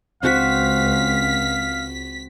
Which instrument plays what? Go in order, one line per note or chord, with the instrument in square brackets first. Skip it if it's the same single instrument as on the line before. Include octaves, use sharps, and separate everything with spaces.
[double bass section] C#2 [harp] C4 F#4 [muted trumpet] F5 [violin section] B6